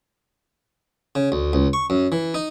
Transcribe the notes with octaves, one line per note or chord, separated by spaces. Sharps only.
C#3
D2
C#2
C#6
F#2
E3
D#4